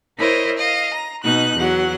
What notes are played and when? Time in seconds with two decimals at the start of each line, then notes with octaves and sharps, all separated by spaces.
0.19 E4 A#4 C5 C#5 D#5
0.58 D#5 F5
0.94 A#5
1.23 B2 D#4 F#6
1.57 E2 F#3 F#5